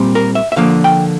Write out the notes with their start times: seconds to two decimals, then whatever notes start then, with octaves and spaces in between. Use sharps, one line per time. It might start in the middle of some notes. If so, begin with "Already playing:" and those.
Already playing: A#2 G3 C4
0.15 A#4
0.35 E5
0.52 E5
0.56 D3 F3 A#3 F5
0.84 G5